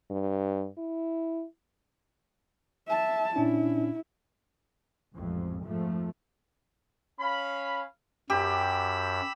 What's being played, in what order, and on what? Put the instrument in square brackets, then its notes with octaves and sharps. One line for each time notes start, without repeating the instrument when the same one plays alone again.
[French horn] G2
E4
[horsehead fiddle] E5 A5
[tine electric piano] A#2 C#4 D4 [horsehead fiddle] E4
[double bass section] A1 F2 G#2
F2 G#2 F3 A3
[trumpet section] C#4 F5 B5
[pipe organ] F#2 [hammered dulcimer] G4 [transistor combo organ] B5 E6